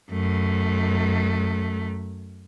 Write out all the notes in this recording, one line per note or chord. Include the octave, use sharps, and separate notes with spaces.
F#2 A3